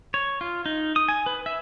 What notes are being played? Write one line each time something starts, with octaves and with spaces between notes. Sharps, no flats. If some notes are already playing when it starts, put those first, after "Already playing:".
C#5
F4
D#4
D#6
G#5
B4
E5